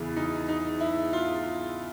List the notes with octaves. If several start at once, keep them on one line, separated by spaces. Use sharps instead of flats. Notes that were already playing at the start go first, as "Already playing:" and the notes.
Already playing: E2 C#3 E3
D#4
D#4
E4
F4